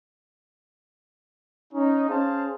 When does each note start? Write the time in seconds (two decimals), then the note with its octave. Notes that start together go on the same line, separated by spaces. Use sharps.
1.74 C#4 D#4
2.08 C#4 G#4 C5 F5 A5